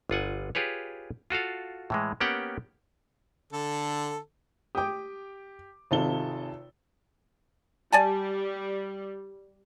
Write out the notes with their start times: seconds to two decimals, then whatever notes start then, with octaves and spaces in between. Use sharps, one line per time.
0.10 G1 F4 F#5 G#5
0.55 F4 G4 G#4 B4 C#5
1.30 F4 F#4 A4 F5
1.90 A2 E3 G#3
2.21 A#3 B3 C#4 G4 F#5 G5
3.53 D3 A4
4.75 G4 G5 D6 D#6
5.91 G#1 C3 D#3 F4 A4 G7
7.92 G3 D5 G#5 A5